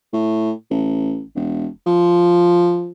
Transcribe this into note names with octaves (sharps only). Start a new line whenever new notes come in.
A2
A1
E1
F3